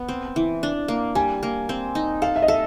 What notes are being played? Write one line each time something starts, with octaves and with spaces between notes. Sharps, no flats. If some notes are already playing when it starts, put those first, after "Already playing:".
Already playing: B3
C4
E3
D4
A#3
G3 G#5
A#3
C4
D#4
A4 F5
E5
D#5
A4 E5